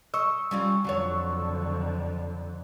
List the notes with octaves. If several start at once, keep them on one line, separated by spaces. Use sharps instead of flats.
D#5 C#6 E6
G3 C#4 F4
F2 D3 F#3 F4 C#5